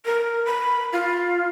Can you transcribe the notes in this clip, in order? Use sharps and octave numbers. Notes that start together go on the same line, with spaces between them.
A#4
B5
F4